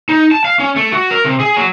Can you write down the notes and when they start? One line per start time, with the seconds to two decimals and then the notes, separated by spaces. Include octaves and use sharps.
0.09 D#4
0.31 A5
0.45 F5
0.59 C#4
0.76 A3
0.92 F#4
1.11 A#4
1.24 C3
1.40 G#4
1.56 F#3